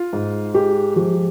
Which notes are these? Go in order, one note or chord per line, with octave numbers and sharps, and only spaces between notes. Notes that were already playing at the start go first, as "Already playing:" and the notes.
Already playing: F4
G#2
G#3 G4
F3 G4